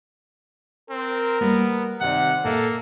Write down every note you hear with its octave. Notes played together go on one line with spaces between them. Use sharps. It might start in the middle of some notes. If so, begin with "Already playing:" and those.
C4 A#4
G3 A#3 B3
C3 D#3 D5 F#5
A#2 A#3 A4 E5 F#5